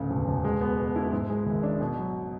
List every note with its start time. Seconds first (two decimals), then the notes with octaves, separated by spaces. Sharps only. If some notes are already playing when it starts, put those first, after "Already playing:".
Already playing: A1 D2 C#3
0.10 E1
0.28 E1
0.44 G#3
0.61 B3
0.78 B2
0.96 E4
1.12 G#2
1.30 G#3
1.46 G#1
1.63 D4
1.81 B2
1.97 F#3